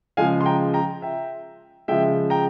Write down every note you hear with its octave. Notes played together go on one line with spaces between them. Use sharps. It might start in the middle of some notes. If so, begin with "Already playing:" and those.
C#3 F3 G#3 F5 G#5
C6
G5 A#5
G5 A#5
E5 G5
C#3 F3 G#3 E5 G5
G5 A#5